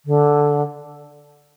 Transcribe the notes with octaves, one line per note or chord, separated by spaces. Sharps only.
D3